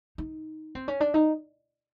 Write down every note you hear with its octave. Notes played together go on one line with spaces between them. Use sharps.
D#4
C4
C#4
D4
D#4